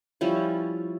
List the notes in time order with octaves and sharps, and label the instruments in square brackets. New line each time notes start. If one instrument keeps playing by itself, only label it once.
[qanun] F3 G3 C#4 E4